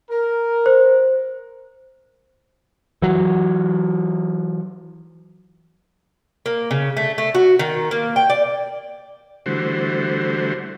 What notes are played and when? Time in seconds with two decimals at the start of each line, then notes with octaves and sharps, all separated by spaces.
0.10 A#4
0.66 C5
3.02 E3 F#3
6.46 A#3
6.71 C#3
6.97 A3
7.18 A3
7.35 F#4
7.59 D#3
7.91 A#3
8.16 G5
8.30 D5
9.46 D3 E3 G3 A3 F#4 C5